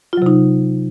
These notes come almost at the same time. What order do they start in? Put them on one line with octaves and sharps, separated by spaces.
F4 F#3 C3 D#4